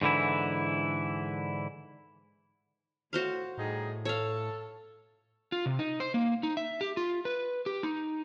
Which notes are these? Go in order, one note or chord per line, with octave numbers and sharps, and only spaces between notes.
G#2 D3 E3 E4
A2 F#4 C5 F5
A2 G3 D#4 G#4
A4 C#5 F5
F4
C3
D#4
C5
A#3
D#4
E5
G4
F4
B4
G4
D#4